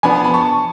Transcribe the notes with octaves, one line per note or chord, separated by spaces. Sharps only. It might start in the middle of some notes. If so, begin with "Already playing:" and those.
F3 B3 D4 G#5 B5
A5
B5
A5 C#6